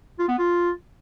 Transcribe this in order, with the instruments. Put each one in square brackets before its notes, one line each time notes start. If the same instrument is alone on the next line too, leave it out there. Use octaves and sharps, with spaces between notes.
[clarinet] F4
B3
F4